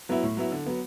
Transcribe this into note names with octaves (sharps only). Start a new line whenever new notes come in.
F#3 B3 E4
A2
F#3 B3 E4
D3
F#3 B3